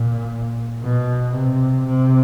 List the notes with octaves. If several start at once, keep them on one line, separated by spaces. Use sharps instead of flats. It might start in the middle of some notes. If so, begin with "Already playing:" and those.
Already playing: A#2
B2
C3
C3